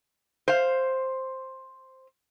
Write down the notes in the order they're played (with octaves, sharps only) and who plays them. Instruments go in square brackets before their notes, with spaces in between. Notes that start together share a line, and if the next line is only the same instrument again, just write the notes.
[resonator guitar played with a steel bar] C5 F5